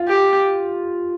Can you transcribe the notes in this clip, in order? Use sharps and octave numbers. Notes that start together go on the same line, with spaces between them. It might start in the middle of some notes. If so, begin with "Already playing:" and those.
Already playing: F4
G4